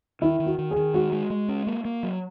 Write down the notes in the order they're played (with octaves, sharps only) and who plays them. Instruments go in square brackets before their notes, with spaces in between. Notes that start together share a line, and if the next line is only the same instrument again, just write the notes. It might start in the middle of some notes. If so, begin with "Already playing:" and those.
[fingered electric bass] D#3 [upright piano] E4
[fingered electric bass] D#3
[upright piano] F#4
[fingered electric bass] D#3
[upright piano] G#4
[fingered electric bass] D#3
[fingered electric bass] G#3 [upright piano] F#4
[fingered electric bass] G#3
G#3
C#4
A#3
A#3
F#3